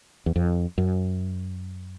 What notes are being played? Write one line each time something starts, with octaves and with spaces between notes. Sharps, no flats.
E2
F2
F#2